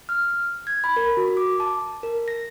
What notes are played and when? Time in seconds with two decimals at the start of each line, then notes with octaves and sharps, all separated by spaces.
0.09 F6
0.67 G#6
0.84 B5
0.96 A#4
1.17 F#4
1.37 D6
1.60 A5
2.03 A#4
2.28 A#6